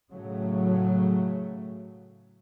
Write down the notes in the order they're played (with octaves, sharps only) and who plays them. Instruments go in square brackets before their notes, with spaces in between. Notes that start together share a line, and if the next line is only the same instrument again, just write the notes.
[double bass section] A2 C#3 F#3 A3